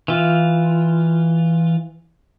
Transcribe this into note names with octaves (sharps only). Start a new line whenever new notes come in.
E3 F4